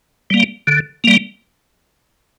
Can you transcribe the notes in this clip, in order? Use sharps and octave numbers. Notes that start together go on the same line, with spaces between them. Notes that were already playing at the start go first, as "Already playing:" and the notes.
G3 A#3
D3
G3 A#3